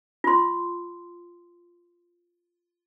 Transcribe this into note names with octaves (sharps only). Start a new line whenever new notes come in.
F4 C6